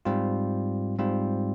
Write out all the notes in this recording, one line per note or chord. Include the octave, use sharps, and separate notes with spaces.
G#2 G3 C4 F4
G#2 G3 C4 F4